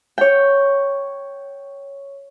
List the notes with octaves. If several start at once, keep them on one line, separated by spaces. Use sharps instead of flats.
C#5 G5